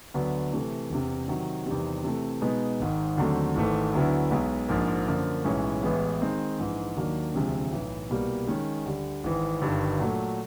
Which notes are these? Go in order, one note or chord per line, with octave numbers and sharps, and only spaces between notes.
D2 D3 F#3 B3
C3 E3 A3
E1 E2 C3
C3 D#3 F#3
E2 C3 D#3 G3 C4
C3 E3 A3
B2 G#3 B3 D#4
G#1 G#2 D#3
D#2 D3 F#3 A3 C4
G#1 G#2 E3 A3
D2 D3 F#3 B3 E4
B1 B2 G#3
A#1 G#2 F3 A#3
F#2 D3 F3 A#3
B1 A2 E3 G#3 C#4
A1 A2 E3 G#3 B3
D#3 G#3 C4 D#4
A#1 G#2 E3
D#2 D#3 F#3 A#3 D4
E1 D2 C3 F3 G#3
B1 A2 E3
C2 B2 G3 A#3
D#3 G#3 C#4
D2 D3 G3
G#1 G#2 E3
G1 G2 D#3
A#2 F#3 A3